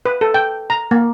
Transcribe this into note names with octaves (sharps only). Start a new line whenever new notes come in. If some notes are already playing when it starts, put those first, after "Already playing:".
B4
A4
G5
A#5
A#3